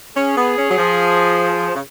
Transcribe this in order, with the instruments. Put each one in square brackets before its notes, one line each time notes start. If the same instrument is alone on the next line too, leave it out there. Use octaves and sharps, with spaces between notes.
[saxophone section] C#4 [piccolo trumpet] G#4
[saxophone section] B3
C#4
F#3
F3
C#3